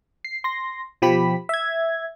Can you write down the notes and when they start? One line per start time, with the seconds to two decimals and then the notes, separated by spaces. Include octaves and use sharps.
0.25 C7
0.44 C6 A#6
1.02 B2 F3 G4 B5 B6
1.49 E5 G#6